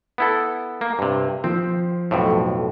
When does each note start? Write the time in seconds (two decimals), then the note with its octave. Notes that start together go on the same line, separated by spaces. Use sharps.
0.18 B3 E4 A4
0.81 A#3
0.99 G2 C3
1.44 F3 C4
2.11 B1 F2 A2